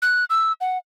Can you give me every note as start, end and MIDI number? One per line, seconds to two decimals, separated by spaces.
0.02 0.24 90
0.30 0.52 88
0.61 0.78 78